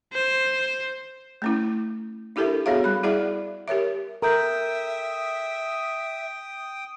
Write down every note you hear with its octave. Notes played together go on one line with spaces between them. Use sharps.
C5
A3 C#4 E4
D4 E4 G4 A4 A#4 E5
B3 F#4 G#4 C#5 E5 F5
G3 B5
E4 G#4 D5 E5 F#5
G4 A#4 C#5 E5
A4 A#4 E5 G5 A#5 D#6 G6